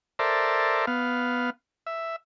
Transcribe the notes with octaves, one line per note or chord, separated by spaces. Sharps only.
A4 A#4 C5 D5 E5
B3 F5
E5